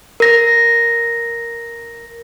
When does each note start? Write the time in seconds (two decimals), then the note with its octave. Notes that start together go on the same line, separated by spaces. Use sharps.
0.20 A#4 A#6